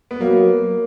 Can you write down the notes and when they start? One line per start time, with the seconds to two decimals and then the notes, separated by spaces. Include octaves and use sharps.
0.11 B3
0.20 F#3 A#3